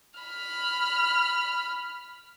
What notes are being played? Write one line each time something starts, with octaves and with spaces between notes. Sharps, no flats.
B5 F6